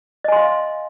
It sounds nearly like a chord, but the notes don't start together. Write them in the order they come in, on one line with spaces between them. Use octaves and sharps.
D#5 G#5 C6 F5